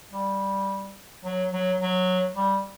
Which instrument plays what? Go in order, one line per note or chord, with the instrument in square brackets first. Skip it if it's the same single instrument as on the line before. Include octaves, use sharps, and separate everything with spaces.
[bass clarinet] G3
F#3
F#3
F#3
G3